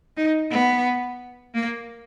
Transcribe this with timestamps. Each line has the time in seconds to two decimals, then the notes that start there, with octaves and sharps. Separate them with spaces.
0.17 D#4
0.51 B3
1.55 A#3